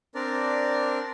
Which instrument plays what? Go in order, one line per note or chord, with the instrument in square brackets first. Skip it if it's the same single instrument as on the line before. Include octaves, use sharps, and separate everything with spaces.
[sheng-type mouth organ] C4 D4 A#4 D5